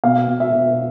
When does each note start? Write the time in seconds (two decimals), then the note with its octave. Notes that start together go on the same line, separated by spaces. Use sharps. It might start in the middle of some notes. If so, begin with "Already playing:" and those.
0.04 B2 F5
0.27 B2
0.40 E5
0.53 B2